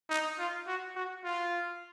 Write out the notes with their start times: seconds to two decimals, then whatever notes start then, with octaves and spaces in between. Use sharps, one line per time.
0.10 D#4
0.38 F4
0.67 F#4
0.96 F#4
1.24 F4